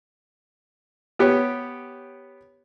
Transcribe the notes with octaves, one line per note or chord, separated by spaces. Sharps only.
B3 G4 C#5